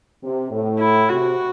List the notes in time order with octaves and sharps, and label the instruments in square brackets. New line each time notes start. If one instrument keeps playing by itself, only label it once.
[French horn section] C3
A2
[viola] E4
[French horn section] C3 [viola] F#4